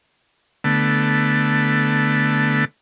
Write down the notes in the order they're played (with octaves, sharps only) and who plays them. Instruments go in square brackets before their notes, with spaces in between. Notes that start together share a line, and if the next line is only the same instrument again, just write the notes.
[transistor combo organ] D3 A3 B3